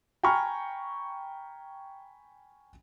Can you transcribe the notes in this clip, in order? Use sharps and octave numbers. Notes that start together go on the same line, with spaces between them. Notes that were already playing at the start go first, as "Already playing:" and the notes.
G5 G#5 A#5 B5 C#6 F6